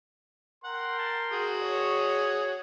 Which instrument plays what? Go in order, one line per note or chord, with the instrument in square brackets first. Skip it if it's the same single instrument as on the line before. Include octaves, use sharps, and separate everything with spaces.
[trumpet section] A#4 G5 C6 [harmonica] F#5
[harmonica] A5
F#4 G#4 D#6
[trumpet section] C#5